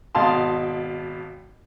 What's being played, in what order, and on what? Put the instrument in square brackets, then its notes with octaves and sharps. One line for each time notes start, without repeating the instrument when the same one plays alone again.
[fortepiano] G#1 B2 F5 A5 C6